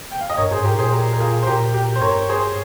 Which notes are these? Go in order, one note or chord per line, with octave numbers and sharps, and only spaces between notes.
G5
F5
D#5
G2 A#4 C#5
G#4 C5
G#2
G4 A#4
A#2 G#4 C5
G4 A#4
A#4
F4 G#4
C5
A#2 G4 A#4
G4 A#4
C5
G2 A#4 C#5
G#4 C5